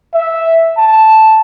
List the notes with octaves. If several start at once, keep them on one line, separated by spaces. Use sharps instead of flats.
E5
A5